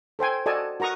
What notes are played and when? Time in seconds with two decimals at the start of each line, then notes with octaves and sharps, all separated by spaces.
0.19 A4 C5 G5 G#5
0.46 F#4 A4 D5 D#5 G#5 A5
0.80 F#4 A#4 A#5 C#6 D#6